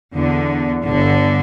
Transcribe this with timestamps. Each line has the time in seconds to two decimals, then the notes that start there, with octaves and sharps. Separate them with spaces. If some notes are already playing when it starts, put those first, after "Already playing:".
0.14 E2 D3
0.84 G1 G2 D3